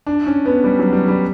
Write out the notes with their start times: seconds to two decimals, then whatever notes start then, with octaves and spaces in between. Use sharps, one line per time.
0.07 D4
0.26 C#4
0.46 B3
0.64 G3
0.79 F#3
0.93 G3
1.08 G3